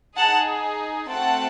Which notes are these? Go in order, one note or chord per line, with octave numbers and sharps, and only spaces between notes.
D#4 G#4 F#5 A5
A3 C4 F#4 A4 F#5 A5